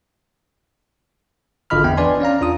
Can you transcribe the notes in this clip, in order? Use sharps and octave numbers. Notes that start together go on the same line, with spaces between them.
G#1 D3 F4 D#5 B5 F6
E2 B3 G5
D4 B4 D5 G#5 C6
C#4 D5 F5 A#5
E2 D4 F4 D#6